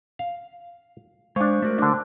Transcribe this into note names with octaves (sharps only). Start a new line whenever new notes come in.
F5
G#3 D4 C5 F5 C#6
A3 F#4 A#4
D3 D4